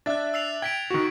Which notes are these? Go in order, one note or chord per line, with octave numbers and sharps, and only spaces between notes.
D4 E5 F#6 A6
E6 C7 F7
G5 G#6 B6 D7
D#3 F#4